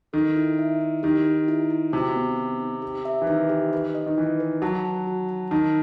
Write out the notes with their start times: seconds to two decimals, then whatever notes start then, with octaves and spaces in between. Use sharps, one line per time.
0.13 D#3 A4
0.36 E4
0.59 E5
0.81 E4
1.03 D#3 G4
1.25 G4
1.48 E4
1.70 E4
1.92 C3 F#4
2.16 B3
2.37 B3
2.60 D#4
2.82 G4
3.05 E5
3.22 E3
3.27 D#3 E5
3.49 G4
3.73 B4
3.95 D#5
4.06 D#3
4.18 E3 E4
4.40 B4
4.62 F#3 A5
4.85 A5
5.07 F#4
5.29 A5
5.51 D#3 A5